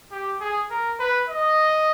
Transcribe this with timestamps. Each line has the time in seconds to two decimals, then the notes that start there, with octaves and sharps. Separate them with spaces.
0.12 G4
0.41 G#4
0.70 A#4
1.00 B4
1.29 D#5